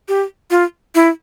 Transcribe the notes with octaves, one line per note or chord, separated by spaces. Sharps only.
G4
F4
E4